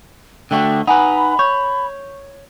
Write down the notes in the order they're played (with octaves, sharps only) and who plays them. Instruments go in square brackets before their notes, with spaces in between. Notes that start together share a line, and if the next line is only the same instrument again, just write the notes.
[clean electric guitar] D3 A3 F#4 [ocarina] G5
[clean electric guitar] D#4 B4 [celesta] F#5 G#5 [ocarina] B5
[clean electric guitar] C#5 [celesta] C#6 G6